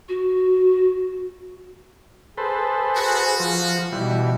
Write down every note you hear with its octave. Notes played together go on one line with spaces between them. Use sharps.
F#4
G#4 A4 B4 C5
F#4
F3
B2 E3 G3